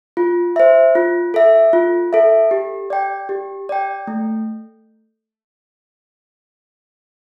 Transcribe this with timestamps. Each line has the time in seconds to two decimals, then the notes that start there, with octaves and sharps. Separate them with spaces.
0.17 F4
0.56 C5 E5
0.95 F4
1.34 A4 E5
1.73 F4
2.13 A4 E5
2.51 G4
2.90 D5 G5
3.29 G4
3.69 D5 G5
4.07 A3